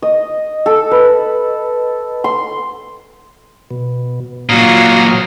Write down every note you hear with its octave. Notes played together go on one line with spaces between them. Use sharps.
D#5
A4
B4
C6
B2
A#2 F#3 F4 F#4 A#5 D#6 F6